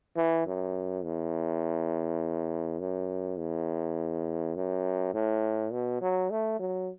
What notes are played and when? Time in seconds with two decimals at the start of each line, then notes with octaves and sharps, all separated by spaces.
0.17 E3
0.47 F#2
1.05 E2
2.80 F#2
3.39 E2
4.56 F#2
5.14 A2
5.73 B2
6.01 F#3
6.31 A3
6.60 F#3